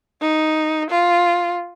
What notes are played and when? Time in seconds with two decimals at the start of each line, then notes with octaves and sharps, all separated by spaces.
0.21 D#4
0.90 F4